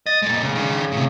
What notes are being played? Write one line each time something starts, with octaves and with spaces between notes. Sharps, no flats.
D#5 A6
A#2 G#3
C#3
D#3 D4
A2 C3